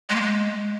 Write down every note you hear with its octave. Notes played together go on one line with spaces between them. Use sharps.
G#3
A#3
G#3